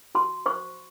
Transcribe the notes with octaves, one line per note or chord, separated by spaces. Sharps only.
F#4 C6
C5 C#6